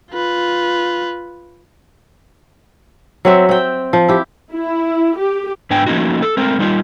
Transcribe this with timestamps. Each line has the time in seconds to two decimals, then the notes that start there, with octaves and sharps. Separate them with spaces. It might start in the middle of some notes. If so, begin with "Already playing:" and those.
0.11 F4 B4
3.25 F#3 C4 E5
3.49 C4 G5
3.93 F3
4.08 E4 G4
4.52 E4
5.16 G4
5.70 G#2 B3 D4 G5 G#5
5.87 F3 A3 A#3 C#4 D#4 F#4
6.22 A4
6.37 G#3 A3 C4 A#4
6.59 G3 D#4 F4 G4